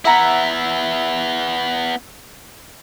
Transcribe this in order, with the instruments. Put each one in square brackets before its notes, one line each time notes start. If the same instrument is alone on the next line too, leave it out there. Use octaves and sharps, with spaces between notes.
[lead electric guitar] B3 E4 [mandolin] E5 F#5 A#5